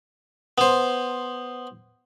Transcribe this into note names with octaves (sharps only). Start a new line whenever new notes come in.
B3 C5